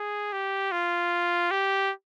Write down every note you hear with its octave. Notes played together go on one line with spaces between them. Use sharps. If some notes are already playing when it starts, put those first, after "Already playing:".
Already playing: G#4
G4
F4
G4